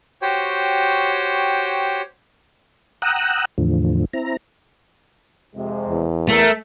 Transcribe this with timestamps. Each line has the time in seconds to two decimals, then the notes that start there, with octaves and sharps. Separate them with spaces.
0.22 F#4 G4 C5 C#5 G5
3.02 F#5 G5 A#5 D#6 E6 F#6
3.58 E2 A2 D3 F3
4.13 C4 E4 A#5
5.56 F2 C3 G#3
5.89 E2
6.29 A3 A#4